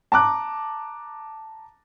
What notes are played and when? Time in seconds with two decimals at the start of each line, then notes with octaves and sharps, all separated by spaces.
0.12 A5 A#5 D6 F#6